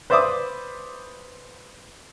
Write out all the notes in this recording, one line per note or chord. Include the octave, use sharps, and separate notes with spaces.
B4 C5 D5 E5 D6 D#6